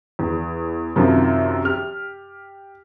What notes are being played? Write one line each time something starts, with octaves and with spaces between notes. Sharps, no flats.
E2
F#2 C3 D#3 F3
G4 F6